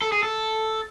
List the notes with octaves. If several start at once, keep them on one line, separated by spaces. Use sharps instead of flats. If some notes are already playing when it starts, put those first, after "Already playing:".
A4
G#4
A4